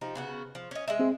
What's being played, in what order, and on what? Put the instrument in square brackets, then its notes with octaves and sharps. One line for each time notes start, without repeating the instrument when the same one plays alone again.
[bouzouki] F3 D#4 G4
C#3 B3 F#4
F3
C#4 D#5
G#3 D#5 E5
[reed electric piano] C4 G#4